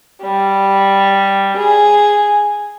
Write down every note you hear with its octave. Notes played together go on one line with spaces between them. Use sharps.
G3
G#4